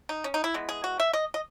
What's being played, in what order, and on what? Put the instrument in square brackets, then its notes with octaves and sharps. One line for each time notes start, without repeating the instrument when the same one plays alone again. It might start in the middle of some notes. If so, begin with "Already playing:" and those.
[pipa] D#4
C#4
D#4
E4
E3 G#3 B3
G#4
F#4
E5
D#5
D#5